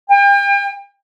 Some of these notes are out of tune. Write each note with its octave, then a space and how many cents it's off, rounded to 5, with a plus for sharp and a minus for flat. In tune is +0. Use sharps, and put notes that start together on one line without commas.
G5 +40